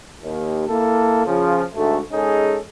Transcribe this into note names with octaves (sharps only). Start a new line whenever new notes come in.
D#2
A#3 E4 A4
C#3 F3
D2 G#2 A3
G#3 C#4 D#4 G#4 A4